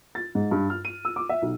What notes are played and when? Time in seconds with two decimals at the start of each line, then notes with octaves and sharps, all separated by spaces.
0.15 A6
0.35 G#2
0.51 G2
0.70 F6
0.85 D#7
1.05 E6
1.16 D6
1.29 E5
1.42 B1